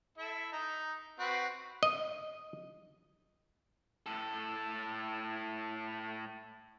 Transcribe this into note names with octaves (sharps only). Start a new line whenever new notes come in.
E4 A4 E5
D#4 A#5
C4 F#4 B4
D#5
A2 A4